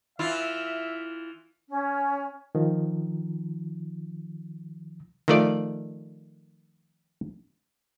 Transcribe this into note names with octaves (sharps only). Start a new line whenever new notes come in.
E3 E4 F4 E5
C#4
D#3 F3
D#3 F3 A3 F4 D5